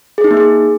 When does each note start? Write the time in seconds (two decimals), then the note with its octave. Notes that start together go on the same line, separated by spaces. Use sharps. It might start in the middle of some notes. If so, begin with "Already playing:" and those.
0.18 G#4
0.24 D#4
0.31 A#3
0.37 G#4